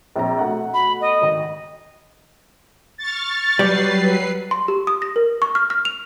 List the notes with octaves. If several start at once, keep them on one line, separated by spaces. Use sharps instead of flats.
A#1 C4 A#5
B2 A3 F#5
B5
D#5
G#1
C#6 F6 A6
F#3 G3 B4 D5 C7
C6
G4
D#6
A#6
A#4
C#6
F6
F6
F7